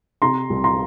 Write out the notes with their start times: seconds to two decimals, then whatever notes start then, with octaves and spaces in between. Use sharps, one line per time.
0.22 C3 A#5 C6
0.50 C2
0.64 A#5 C6